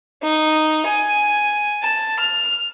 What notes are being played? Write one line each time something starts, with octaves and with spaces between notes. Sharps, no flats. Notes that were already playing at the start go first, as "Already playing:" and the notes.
D#4
G#5
A5
F6